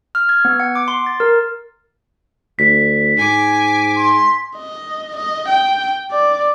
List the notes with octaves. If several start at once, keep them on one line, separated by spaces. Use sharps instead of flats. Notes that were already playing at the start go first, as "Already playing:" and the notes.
F6
G#6
B3
F#5
D6
C6
A6
A#4
D2 B6
G#2 G#5 D6
C6
D#5
D#5
G5
D5